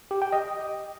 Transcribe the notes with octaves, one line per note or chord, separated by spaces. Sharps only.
G4
G5
D#5